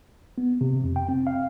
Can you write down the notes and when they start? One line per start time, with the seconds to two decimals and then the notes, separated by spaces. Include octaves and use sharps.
0.38 B3
0.61 C3
0.84 F2
0.96 G5
1.09 C4
1.27 F5